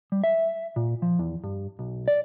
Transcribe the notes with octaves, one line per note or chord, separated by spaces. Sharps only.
G3
E5
A#2
F3
E2
G2
B1
D5